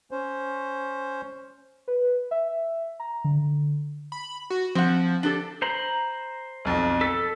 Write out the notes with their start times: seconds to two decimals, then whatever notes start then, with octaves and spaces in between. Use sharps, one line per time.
0.11 C#4 C5
1.88 B4
2.31 E5
3.00 A#5
3.24 D3
4.12 B5
4.50 F#4
4.75 F3 C4 F#5
5.23 D4 G4 A4
5.62 C5 A#5 B5
6.65 B1 F2
7.01 A4 B6